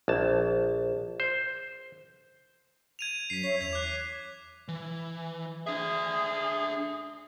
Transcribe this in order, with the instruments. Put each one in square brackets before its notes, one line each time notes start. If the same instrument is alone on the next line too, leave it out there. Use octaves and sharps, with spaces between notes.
[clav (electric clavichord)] A#1 A5
C5
[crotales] G#6 D#7 F7
[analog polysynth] F#2 [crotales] B6 C7
[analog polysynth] C#5 E5 [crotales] B6
[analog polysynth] E2 [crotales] G#6 B6 F7
[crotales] D6 F#6
[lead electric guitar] E3
[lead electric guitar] D4 E5 [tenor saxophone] G#4